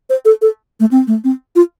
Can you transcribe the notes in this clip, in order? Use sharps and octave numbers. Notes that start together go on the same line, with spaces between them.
C5
A4
A4
A3
C4
A3
C4
F4